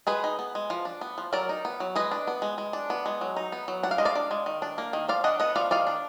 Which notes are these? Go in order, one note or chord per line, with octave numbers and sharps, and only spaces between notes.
G#3 G#4 B4
D#4
B3
G#3
F3
D4
B3
F3
F#3 A#4 D5
D#4
B3
F#3
G#3 B4 D#5
D4
B3
G#3
G#3
D4
B3
G#3
F#3
D#4
B3
F#3
D4 F#5
F5
G#3 D#5
D5 F5
D4
G#3
D#3
D4
A#3
D#3
F3 D5 F5
D4 D#5 F#5
B3 D#5 F#5
F3 D5 F5
D#3 D5 F5
D4